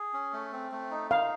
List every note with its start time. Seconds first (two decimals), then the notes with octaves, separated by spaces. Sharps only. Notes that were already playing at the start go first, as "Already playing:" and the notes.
Already playing: G#4
0.13 C#4
0.33 A3
0.53 C4
0.72 A3
0.91 D#4
1.11 D#4 F5